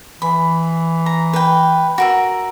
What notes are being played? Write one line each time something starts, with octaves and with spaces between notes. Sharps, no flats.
E3 B5
A#5
B4 G5
F#4 A#4 E5